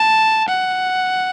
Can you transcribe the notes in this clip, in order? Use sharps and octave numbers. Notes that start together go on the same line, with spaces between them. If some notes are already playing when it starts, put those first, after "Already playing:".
Already playing: A5
F#5